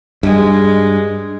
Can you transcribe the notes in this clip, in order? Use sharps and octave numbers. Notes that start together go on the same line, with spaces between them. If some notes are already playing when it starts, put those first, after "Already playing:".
G2 G#3